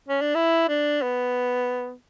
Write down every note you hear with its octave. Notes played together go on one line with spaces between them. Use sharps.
C#4
D4
E4
D4
B3